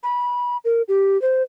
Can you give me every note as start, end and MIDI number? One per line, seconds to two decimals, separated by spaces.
0.03 0.57 83
0.65 0.82 70
0.88 1.20 67
1.22 1.43 72